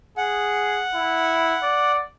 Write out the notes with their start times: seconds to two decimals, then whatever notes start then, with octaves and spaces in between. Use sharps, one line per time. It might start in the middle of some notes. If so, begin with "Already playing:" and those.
0.17 G#4 F#5
0.95 E4
1.63 D5